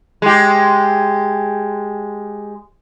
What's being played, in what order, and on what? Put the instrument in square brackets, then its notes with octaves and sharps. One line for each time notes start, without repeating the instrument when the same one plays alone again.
[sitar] G#3 G4